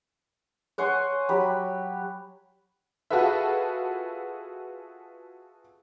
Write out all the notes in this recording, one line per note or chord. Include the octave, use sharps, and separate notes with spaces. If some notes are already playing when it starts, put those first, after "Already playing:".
C#5 F#5 G#5 C6
F#3 G4 B5
F4 F#4 G#4 A4 B4 E5